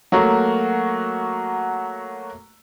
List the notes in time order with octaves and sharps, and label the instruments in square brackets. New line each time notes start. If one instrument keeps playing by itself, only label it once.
[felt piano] F#3 A3 A#3 F#4